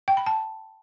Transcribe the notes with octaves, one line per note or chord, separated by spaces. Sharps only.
G5
B5
A5